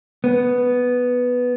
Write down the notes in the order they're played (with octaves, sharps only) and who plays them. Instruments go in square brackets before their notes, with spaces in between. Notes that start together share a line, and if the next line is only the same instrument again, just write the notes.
[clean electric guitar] B3